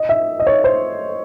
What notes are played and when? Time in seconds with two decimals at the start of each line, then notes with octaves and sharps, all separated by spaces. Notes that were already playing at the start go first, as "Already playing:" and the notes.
Already playing: D#5
0.09 E5
0.40 D#5
0.47 C#5
0.64 C5